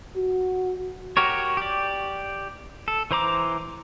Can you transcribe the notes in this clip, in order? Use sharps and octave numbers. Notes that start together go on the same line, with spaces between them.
F#4
F#4 G4 A#4 C#5
G4 D5
A4
E3 C5 A#5 D6